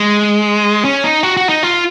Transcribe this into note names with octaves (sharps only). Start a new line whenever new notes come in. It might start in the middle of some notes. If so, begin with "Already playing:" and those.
Already playing: G#3
C#4
D#4
F#4
F#4
D#4
F4